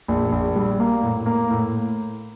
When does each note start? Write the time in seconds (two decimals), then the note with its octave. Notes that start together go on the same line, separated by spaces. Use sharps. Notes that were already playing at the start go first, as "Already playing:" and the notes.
0.08 A#1
0.32 A#1
0.56 G3
0.80 A#3
1.02 A2
1.26 A#3
1.50 A2